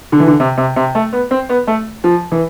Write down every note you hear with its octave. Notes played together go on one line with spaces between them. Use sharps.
D3
E3
D3
C3
C3
C3
A3
B3
C4
B3
A3
F3
E3